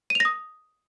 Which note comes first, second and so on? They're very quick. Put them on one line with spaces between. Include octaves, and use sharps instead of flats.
D#7 F7 A#6 D#6